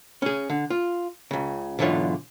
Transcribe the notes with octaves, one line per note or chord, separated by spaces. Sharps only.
C#4 G#4
D3
F4
C#2 C#3
B1 G#2 D3 E3 F4 C#5